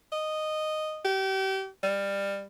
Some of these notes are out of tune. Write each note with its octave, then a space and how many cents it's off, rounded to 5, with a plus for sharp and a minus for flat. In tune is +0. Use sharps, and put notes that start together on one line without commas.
D#5 -10
G4 -35
G3 +20